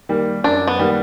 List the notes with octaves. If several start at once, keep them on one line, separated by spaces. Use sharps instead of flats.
D#3 G3 A#3
F#2 D4
B3
D#3 G3 A#3